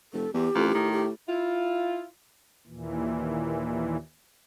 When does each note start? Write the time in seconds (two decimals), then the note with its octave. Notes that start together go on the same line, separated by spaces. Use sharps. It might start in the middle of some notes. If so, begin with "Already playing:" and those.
0.13 F1 A4
0.34 E2 G4
0.55 A1 F2
0.75 A2 D#3
0.92 G4
1.27 E4 F4
2.67 D#2 A#2 E3